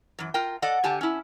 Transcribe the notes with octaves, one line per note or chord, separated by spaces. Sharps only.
F#2 E3
F4 A#4 G5
A4 D5 D#5 F#5
D3 G4 G#5 A5
C#4 E4